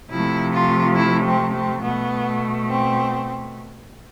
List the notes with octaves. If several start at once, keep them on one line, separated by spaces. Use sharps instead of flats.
C3 F3 A3 E4
F4
E4
C4
C4
B2 A3 B3
C4